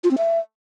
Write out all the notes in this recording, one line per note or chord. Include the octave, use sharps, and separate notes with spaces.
F4
C4
E5